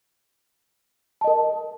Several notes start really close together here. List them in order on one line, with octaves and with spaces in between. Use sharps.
A5 D#5 A#4